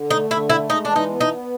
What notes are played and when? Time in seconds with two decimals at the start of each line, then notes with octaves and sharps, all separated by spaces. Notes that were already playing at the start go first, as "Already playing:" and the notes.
Already playing: D3
0.10 A3 D#4
0.30 D3 E4
0.49 A3 E4
0.70 G#3 D#4
0.85 E3 D4
0.96 D#4
1.09 B3
1.21 D#4
1.28 B3